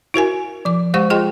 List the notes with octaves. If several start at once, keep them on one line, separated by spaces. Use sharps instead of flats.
E4 F#4 A#4 G#5
F3 D6
G#3 G4 C5 F#5 C#6
F4 G#4 D#5 G5 C6